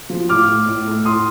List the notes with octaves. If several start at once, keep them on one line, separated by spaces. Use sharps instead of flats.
F3
A2 D6 F6
A3
A2
A3
A2 C6 D#6